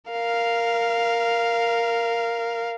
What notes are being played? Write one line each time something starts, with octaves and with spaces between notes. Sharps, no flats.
A#4 F5